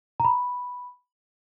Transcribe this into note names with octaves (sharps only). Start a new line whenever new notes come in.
A#5
B5